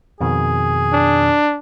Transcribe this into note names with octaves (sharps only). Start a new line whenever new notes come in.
F2 B2 D#3 G#4
D4